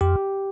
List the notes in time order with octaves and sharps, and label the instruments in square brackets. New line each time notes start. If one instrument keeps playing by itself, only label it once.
[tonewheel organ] F2 [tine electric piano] G4